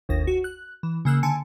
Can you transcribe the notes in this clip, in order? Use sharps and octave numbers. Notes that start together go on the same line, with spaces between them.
G1 D#2 A#6
F#4
F#6
E3
C#3 A#3 E6 F#6
D3 G#5 A5 C#7